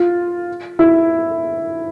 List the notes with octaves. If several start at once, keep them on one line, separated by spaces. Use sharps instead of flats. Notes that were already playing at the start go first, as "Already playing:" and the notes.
Already playing: F4
E4